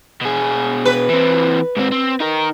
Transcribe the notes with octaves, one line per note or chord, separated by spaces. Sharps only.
B2 G#4
B4
E3 C4
G#2 C4
C4
D#4 A#4